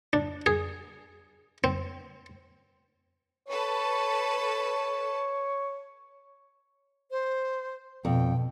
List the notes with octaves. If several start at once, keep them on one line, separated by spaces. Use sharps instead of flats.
D4
G#4
C4
A4 B4 C#5 A5
C5
F2 B2 G5